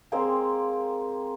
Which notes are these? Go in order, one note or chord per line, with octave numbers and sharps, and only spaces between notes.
G#3 A#3 C4 G5